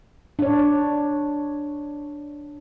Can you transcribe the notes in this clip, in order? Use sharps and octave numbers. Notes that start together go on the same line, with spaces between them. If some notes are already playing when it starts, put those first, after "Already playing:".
D4 C#5